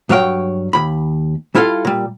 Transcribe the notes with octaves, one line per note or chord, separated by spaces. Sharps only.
G2 F#3 C#5 F5 G5
D#2 B5
G3 E4 F4 A4 F5
A#2 G3